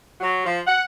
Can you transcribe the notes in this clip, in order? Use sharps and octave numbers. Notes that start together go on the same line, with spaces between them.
F#3
F3
F#5